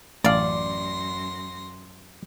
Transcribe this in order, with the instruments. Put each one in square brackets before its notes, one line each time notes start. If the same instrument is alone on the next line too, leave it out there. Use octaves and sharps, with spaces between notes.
[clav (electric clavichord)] A1 F5 [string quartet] F#2 C6 A#6 [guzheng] D5